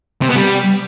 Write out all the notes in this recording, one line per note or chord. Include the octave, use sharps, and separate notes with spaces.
C3
B3
G3